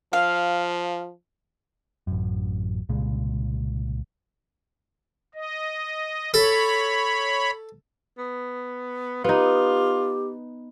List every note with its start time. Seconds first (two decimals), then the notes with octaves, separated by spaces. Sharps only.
0.13 F3 F5
2.07 A1 F#2
2.89 C2 A#2 C#3 G#3
5.34 D#5
6.34 A4 C#5 B5
8.18 B3
9.24 B3 D#4 F4 G4